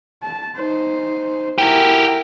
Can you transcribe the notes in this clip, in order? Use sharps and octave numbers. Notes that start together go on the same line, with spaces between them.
A5
D#4 C5
E4 F#4 G4 A#4